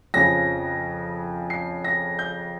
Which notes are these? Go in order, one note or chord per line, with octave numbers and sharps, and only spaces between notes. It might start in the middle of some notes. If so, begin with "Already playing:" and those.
F2 C#3 F3 A#6
C7
A#6
G6